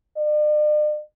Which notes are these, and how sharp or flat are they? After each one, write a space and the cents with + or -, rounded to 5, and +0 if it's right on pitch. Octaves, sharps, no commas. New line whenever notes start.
D5 +45